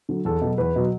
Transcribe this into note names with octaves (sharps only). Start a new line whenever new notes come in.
D3 F#3
E2 A4
B2 F#3
E2 B4
B2 F#3